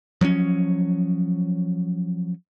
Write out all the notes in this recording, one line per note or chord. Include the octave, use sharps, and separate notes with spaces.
F3 F#3 B3 C#4